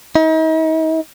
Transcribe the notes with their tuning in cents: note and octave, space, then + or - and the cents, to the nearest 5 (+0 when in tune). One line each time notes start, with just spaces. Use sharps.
D#4 +40